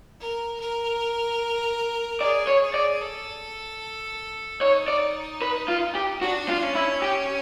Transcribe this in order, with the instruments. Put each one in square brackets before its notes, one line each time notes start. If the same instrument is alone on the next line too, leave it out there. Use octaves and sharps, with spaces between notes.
[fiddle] A#4
A#4
[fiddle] G#4 [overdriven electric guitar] D5
[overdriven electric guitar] C#5
[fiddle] G#4
[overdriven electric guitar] D5
[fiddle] A4
[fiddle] D#4 [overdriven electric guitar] C#5
[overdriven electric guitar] D5
B4
F4
G4
[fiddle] D4 [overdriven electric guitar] F#4
[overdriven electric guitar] F4
[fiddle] C#4
[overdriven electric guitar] E4
G4